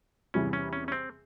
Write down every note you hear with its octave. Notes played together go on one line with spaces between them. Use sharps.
E2 C3 E3 G3 C#4
C#4
C#4
C#4
C4